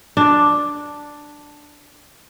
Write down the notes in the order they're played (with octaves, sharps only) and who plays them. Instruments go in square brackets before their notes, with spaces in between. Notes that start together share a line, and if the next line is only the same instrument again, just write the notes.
[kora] D4 D5